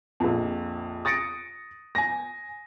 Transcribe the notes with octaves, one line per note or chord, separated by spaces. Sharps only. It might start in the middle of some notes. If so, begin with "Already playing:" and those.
A#1 F2
D#6 A6 A#6 C#7 D7
G#5 A#6